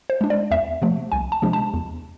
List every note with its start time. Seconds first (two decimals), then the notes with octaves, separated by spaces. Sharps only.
0.10 C5
0.21 G#3 D4
0.30 D5
0.51 E2 E5
0.82 C3 F3 A3
1.12 C2 G#5
1.32 A5
1.42 C3 F3 G#3 D4
1.53 A5
1.74 E2